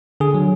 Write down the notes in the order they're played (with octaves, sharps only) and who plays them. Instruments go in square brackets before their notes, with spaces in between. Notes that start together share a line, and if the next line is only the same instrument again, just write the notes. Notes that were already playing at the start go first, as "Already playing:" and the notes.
[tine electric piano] D3 G#4
F#3